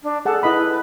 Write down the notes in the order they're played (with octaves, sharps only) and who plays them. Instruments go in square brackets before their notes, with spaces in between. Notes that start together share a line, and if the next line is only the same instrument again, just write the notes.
[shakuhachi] D4
[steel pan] G#4 F#5 A5 [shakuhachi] A4
[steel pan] E4 D#5 B5 [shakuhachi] B4